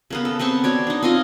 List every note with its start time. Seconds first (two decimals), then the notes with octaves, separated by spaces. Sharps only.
0.10 C#3 A#3 B3
0.25 A4
0.39 B3 C4 C5 C#6
0.64 F#4 C#5 D5
0.87 D4 D#4
1.02 C4 D#4 F4 D#5